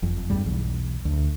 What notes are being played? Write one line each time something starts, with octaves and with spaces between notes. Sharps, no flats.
F#1 F2
G#1 E2 G2 G3
B1 E2
D2